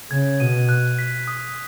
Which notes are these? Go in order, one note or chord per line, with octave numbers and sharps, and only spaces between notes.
C#3 G#6
B2 D#7
F#6
B6
D#6